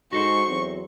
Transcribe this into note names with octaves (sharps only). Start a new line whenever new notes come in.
G#2 F#4 A4 C5 C#6
E2 F#3 C4